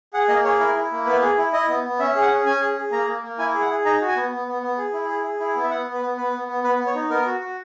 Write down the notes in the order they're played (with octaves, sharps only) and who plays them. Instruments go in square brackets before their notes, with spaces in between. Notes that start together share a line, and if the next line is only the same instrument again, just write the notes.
[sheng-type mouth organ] G#4 F#5
A#3 D#5
G#4 C#5
E4 A#4
E4
A#3
B3 B4
G#4
E4
E4 D#5
B3
B3
C#4 E5
G#4
F#5
C#4
C#4 G#5
G#4
G#4
A#3 A#5
A#3
A#3
E4 G#5
G#4
F#5
G#4
D#4 A#5
F#4
G#5
B3
B3
B3
B3
G#4
E4
G#4
G#4
E4
B3
E5
B3 F#5
B3
B4
B3
B3 B4
B3
B3
B3 B4
B3
C#5
D#4
B3 A#4
F#4
F#4